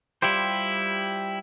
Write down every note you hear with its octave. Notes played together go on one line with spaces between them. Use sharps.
G3 E4 F4 G4 C5